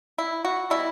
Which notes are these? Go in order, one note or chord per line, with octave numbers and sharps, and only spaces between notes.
E4
F#4
B2 G3 B3 E4